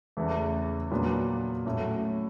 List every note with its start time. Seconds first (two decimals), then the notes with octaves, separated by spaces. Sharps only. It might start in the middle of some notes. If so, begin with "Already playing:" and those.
0.17 E2 C#3 E3 A3
0.91 A#2 F#3 B3 D4
1.66 A2 F#3 A3 C#4